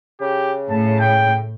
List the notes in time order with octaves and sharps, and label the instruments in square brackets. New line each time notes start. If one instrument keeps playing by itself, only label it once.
[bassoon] C#3 [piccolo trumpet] G4
[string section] A2 [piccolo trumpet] A5
[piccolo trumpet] G5